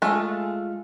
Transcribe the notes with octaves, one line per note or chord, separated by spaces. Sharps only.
G#3 A3 F4